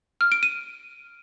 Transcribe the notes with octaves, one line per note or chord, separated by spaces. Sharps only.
F6
D7
D#7